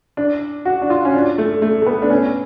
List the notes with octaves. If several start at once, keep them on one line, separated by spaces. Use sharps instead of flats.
D4
F#4
D4
F4
C#4
D4
A3
A3
A3
B3
D4
C#4